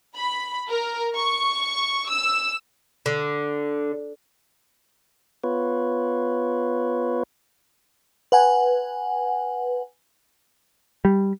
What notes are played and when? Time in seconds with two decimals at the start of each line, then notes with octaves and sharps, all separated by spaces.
0.16 B5
0.69 A#4
1.15 C#6
2.10 E6
3.06 D3
5.44 B3 F4 B4 C#5
8.32 B4 F#5 G#5
11.05 G3